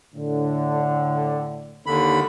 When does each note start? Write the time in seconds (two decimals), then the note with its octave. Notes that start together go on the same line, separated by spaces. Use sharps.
0.15 A2 D3
1.86 D#2 D3 B5